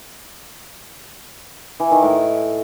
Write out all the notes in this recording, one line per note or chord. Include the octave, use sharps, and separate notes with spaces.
E3
D#3
A2